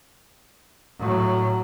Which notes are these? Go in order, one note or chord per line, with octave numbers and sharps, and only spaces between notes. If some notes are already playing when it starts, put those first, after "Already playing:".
A2 F#3